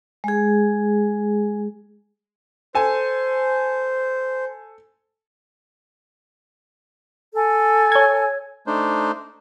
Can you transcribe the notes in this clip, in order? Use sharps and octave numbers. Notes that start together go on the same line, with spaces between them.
G#3 G#4
A4 C5 G#5
A4 G#5
C#5 G#6
A3 D4 D#4 C5